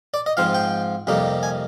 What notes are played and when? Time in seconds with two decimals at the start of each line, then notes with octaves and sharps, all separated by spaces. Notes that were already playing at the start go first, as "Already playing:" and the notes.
0.14 D5
0.26 D#5
0.37 G#2 F3 C4 F4 F5
0.54 G5
1.07 F2 C3 G3 A#3 D#4
1.43 G#5